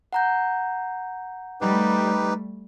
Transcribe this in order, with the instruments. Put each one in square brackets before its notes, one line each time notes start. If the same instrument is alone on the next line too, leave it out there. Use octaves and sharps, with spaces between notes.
[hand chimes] F#5 A#5 G6
[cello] G3 A3 [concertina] D#4 G4 B4